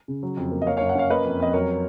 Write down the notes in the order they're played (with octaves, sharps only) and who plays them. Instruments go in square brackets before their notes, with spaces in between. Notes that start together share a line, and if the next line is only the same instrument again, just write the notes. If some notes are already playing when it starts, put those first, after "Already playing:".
[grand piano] C#3
F#3
F2
A#3
D#5
A#3 C#5 F5
C#5 F5
F#2
F#5
C#4 C#5 F5
A#3 B4 D#5
F2
F2 D#5
F#3 A#4 C#5